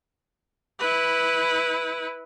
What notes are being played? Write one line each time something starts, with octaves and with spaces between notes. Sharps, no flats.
E4 B4